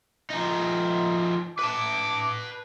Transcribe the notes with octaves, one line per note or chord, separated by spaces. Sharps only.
F3 D#4
B4 A5 D6